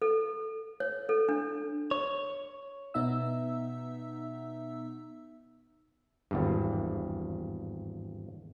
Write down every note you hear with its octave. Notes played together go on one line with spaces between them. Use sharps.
A4
C#5
A4
D4
C#5
B2 B3 D#4 E5 E6
G#1 E2 G2